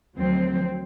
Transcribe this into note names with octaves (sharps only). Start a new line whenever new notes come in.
D2 D#3 F3 F#3 C4